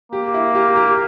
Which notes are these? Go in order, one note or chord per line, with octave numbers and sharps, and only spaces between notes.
A#3 G4
E4
G4
G4